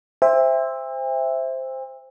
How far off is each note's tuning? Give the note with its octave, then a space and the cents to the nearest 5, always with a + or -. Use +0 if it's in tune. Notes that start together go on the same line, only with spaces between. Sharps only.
C5 +0 E5 +0 G5 +45